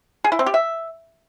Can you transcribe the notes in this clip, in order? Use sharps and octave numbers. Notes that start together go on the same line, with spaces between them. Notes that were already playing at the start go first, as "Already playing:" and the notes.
G#4
E4
C4
G4
E5